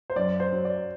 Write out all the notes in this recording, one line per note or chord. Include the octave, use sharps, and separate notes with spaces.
C5
F#2 D5
C5
F#3
D5